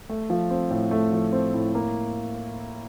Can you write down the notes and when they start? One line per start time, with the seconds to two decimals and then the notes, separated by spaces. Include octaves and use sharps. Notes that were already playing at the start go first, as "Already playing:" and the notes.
0.10 A3
0.30 F3
0.50 C4
0.71 A2
0.91 A3
1.12 F3
1.32 C4
1.54 A2
1.75 A#3